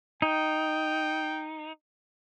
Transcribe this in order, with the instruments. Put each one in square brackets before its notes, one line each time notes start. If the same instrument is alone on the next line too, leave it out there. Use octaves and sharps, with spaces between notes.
[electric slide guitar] D#4 [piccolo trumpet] G5